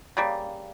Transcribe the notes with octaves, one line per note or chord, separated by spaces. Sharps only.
C#3 G3 A#3